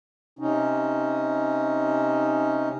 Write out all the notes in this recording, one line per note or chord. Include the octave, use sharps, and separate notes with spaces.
C3 C#4 D#4